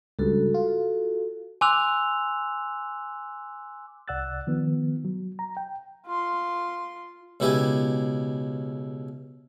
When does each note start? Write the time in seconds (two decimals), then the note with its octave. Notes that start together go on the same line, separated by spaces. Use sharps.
0.19 C#2 G2 F#4 A4
0.54 F4
1.61 G#5 C6 D6 E6 F#6 F7
4.08 C2 D5 F#5 E6 F#6 A6
4.47 D#3 F3 B3
5.05 F#3
5.39 A#5
5.57 G5
6.06 F4 C6
7.40 C#2 B2 E4 G4 E5 G#5